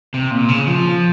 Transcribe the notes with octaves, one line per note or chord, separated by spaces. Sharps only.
C3
A#2
C#3
F3